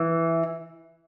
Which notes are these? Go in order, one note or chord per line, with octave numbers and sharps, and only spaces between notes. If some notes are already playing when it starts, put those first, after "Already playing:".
Already playing: E3